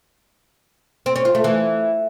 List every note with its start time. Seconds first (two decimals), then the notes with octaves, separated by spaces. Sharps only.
1.06 C4
1.16 C#4
1.25 F4
1.35 A3
1.44 E3